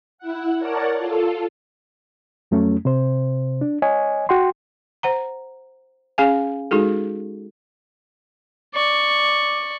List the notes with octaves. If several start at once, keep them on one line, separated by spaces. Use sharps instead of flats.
E4 F#5
A#4 C#5 D5 F#5 A5
F4 A4
F2 F#3 A3 C#4
C3 C5
D4
C#5 D#5 G#5
F#4 G5 C6
C5 F#5 A#5
C#4 G#4 F5 G#5
G#3 D#4 F#4 G#4 A4
D5 C#6